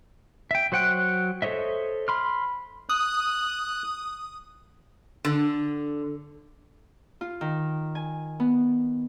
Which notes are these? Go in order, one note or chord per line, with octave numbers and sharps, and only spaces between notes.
E5 G5
F#3 C5 F#5 G5 F#6
A4 C5 C#5 D#5 E5
B5 C6 F6
D#6 F#6
D3
F4
D#3
G#5
B3